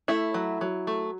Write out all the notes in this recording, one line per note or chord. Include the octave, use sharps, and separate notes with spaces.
A3 E4
F#3
F#3
A3